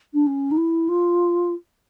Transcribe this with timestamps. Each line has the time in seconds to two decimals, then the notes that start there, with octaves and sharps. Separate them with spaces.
0.14 D4
0.27 C#4
0.51 D#4
0.57 E4
0.89 F4